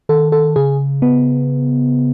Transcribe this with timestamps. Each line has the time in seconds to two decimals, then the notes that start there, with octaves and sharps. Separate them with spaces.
0.09 D#3 A4
0.32 A4
0.56 C#3 G#4
1.02 B3